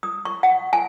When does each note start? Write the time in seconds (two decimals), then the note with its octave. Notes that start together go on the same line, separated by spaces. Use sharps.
0.03 D#6
0.25 C#6
0.43 F#5
0.73 G#5